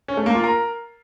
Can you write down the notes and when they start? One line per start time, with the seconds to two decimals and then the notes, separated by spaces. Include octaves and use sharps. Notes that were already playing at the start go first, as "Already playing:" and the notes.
0.08 C#4
0.17 A3
0.26 A#3
0.35 F4
0.44 A#4